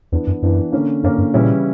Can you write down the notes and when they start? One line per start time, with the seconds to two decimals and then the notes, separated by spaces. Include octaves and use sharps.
0.12 E2 E3 B3 D4
0.27 F#2
0.42 F#2 E3 B3 D4
0.72 D3 A#3 C#4
1.03 F#2 D3 A#3 C#4
1.18 G2
1.34 A#2 C#3 E3 G3 C#4 E4